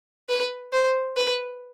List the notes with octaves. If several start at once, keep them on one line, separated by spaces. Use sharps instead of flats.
B4
C5
B4